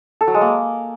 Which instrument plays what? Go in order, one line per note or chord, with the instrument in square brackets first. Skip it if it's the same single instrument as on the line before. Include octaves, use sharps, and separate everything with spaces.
[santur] A4
F#3
G#3
A#3